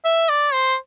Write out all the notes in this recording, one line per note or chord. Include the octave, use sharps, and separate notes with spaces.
E5
D5
C5